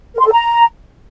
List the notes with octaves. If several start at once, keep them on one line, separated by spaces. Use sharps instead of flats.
A#4
C6
A4
A#5